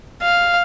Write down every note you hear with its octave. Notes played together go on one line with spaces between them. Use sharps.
F5